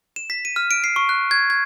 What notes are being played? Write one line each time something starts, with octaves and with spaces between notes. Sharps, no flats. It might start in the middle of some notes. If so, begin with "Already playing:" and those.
E7
B6
D#7
F6
D7
C7
C#6
F#6
G#6
G#6